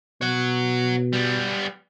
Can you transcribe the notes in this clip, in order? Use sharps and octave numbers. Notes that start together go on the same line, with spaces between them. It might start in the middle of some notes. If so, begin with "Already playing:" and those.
B2 C#5 F#5
G3 B3